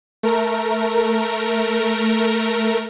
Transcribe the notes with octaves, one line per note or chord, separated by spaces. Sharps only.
A3 A#4